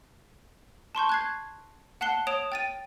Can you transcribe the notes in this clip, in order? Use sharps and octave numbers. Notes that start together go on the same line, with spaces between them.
A5 C6 C#6 G6
F#6 G#6 C7
F#5 A5 F#6 C7 G7
C#5 D#6 D7 E7 F7
G5 A6 D#7